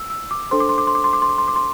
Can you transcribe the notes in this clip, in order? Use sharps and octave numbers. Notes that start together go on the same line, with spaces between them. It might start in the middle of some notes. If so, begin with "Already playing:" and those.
Already playing: E6
E6
D6
D4 A4 C5 C6
D6
C6
D6
C6
D6
C6
D6
C6
D6
C6
D6
C6